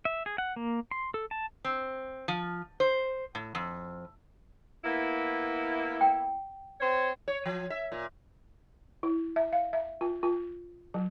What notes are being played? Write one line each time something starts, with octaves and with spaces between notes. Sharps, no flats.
E5
G#4
F#5
A#3
C6
A4
A5
C4
F3
C5
A2
F2
A#3 B3 E4
G5
C4 C5 C#5
C#5
F3
E5
A#2
E4
E5
F5
E5
F4
F4
F#3